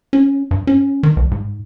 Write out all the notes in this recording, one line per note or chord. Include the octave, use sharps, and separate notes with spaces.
C#4
G2
C#4
D#3
C2
G#2